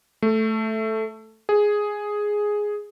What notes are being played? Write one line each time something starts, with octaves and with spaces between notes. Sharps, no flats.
A3
G#4